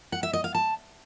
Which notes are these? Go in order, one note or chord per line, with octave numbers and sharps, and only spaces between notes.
F#5
E5
D#5
F5
A5